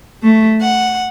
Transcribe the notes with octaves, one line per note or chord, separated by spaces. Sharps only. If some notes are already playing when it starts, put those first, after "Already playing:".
A3
F#5